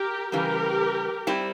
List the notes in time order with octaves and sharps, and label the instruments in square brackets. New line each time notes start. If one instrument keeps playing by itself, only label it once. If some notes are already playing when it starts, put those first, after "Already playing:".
Already playing: [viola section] G4 A#4
[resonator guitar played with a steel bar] C#3 E3 G3 [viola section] G4 A#4
[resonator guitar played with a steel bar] G3 C4 E4